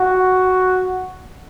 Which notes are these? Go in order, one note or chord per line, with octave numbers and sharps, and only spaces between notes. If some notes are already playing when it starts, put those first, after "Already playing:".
Already playing: F#4